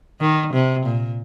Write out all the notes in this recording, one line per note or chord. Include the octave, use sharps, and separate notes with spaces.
D#3
C3
A#2